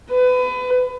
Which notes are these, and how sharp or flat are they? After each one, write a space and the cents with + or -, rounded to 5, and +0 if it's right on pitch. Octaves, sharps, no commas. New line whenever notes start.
B4 +30